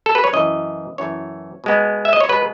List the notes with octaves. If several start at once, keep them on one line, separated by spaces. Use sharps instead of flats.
A4
B4
C#5
F#2 E3 A3 D#5
F#2 E3 A3 C#5
B2 G#3 B3
E5
D#5
C#5
B2 G#3 B3 B4